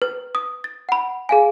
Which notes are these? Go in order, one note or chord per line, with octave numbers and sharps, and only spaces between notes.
B4
D#6
A6
F#5 B5
G#4 F5 G#5